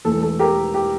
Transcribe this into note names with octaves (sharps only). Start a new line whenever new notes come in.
E1 E2 E3 A3 A4
A4
G4 A#4
G4